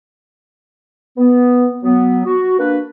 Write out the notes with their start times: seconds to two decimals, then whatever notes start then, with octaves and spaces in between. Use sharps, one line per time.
1.18 B3
1.83 F#3 B3
2.26 F#4
2.59 A#3 D4 B4